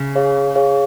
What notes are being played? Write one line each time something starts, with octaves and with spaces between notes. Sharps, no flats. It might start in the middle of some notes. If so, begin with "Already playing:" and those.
Already playing: C#3
G#4 C#5 F5
G#4 C#5 F5